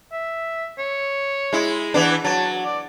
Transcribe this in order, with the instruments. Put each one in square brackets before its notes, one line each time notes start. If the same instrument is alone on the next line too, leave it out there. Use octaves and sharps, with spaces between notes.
[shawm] E5
C#5
[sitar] G#3 E4
E3 B3 D4
[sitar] F#3 [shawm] A5
[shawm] D5